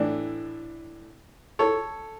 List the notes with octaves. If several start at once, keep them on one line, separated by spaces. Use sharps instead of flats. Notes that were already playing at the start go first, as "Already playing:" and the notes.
Already playing: A2 E3 D4
A4 C#5